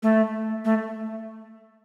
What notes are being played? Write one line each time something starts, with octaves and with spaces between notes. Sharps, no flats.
A3
A3